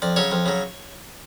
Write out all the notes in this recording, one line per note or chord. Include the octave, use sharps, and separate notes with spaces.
F2 D5
C#3 F#3 C#5
F2
C#3 F#3